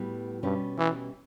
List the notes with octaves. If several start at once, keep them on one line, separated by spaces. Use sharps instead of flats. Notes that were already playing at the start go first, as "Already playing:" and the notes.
Already playing: A2 G3 B3 F#4 B4
G2 B2 G3 C#4 G4 B4
E3